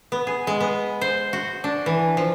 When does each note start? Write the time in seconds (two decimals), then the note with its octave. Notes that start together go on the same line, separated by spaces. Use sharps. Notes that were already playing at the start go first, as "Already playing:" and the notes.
0.12 B3
0.27 G#4
0.47 G#3
0.60 B3
1.01 C5
1.33 F#4
1.64 D4
1.86 E3
2.17 F3